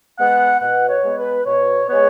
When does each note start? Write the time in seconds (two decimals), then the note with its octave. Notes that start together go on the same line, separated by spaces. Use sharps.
0.19 G#3 B3 F#5
0.61 B2 F#5
0.89 C#5
1.04 G#3 B3
1.18 B4
1.46 B2 C#5
1.89 G#3 B3 C#5